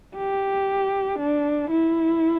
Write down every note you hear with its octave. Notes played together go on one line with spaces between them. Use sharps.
G4
D4
E4